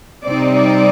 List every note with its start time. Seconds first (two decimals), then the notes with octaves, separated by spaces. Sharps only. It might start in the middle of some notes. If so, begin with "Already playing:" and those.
0.25 C3 G3 C4 D#4 D5
0.55 D5